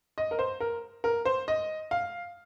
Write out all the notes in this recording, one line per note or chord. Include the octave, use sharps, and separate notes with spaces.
D#5
A#4
C5
A#4
A#4
C5
D#5
F5